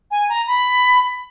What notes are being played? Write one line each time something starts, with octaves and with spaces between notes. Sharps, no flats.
G#5
A#5
B5